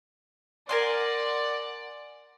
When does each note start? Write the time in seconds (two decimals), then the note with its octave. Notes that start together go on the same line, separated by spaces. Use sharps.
0.69 A#4 D5 F#5 G#5 C6